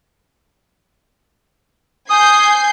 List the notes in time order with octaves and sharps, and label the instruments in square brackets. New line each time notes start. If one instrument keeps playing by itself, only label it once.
[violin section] G#5 G6 C7 [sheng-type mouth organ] D#6